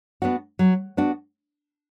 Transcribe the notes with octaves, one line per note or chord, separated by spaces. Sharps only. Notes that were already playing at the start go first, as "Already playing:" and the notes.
B3 D4 F#4
F#3
B3 D4 F#4